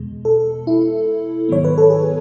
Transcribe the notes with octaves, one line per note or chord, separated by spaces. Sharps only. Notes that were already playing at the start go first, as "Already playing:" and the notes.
Already playing: E2 B2 G#3
A4
E4
G#2 D#3 F#3 B3 C#5
B4
A4
G#4